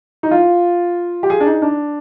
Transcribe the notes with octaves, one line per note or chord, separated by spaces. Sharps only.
D#4
F4
G4
G#4
D4
D#4
D4